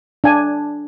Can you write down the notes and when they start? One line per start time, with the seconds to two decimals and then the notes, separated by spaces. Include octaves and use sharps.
0.24 D4 G#5